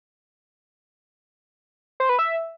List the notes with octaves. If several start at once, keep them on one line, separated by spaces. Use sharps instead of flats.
C5
B4
E5